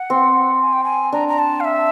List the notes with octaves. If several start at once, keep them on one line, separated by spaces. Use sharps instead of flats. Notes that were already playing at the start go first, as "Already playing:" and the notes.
Already playing: F#5
C4
G#5
G5
G#5
D4 A#5
A#5
A5
F5
E5